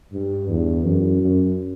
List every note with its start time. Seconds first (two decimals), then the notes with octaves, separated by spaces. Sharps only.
0.13 G2
0.49 E2
0.84 F#2
1.21 F#2